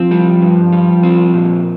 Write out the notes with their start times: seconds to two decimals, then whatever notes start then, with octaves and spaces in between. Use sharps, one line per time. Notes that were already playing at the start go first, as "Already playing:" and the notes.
Already playing: F3 C4
0.11 G3
0.42 G2
0.73 G3
1.03 C4
1.34 A#2